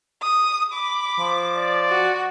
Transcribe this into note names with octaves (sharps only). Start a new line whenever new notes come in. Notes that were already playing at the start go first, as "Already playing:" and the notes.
D#6
B5 D6
F3
D5
F#4